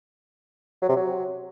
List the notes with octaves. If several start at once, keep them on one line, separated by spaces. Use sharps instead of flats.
F#3
C3
F#3